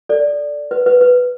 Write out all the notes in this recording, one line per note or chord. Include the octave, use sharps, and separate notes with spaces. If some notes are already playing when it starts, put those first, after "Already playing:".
A4 D5
B4
B4
B4